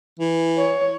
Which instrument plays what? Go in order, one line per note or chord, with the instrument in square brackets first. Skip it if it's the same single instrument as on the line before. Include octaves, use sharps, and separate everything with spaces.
[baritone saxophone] E3
[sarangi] C#5